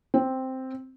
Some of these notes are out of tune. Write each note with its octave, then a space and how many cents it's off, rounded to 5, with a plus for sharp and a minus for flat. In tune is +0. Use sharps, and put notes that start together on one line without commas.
C4 +0